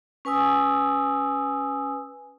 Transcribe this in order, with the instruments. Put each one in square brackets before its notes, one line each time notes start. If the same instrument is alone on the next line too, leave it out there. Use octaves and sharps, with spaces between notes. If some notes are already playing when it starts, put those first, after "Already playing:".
[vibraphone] C#4 B4 G#5 D#6 E6